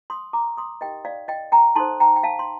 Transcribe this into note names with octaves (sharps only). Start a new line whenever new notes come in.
C6 D#6
A#5 D6
C6 D#6
D#4 G4 A#4 D#5 G5
D5 F5
D#5 G5
G5 A#5
D#4 A4 C5 A5 C6
G5 A#5
G5
F5 A5
C6